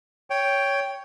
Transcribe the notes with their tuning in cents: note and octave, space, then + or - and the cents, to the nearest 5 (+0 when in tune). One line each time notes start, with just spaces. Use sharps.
C#5 +10 G5 +0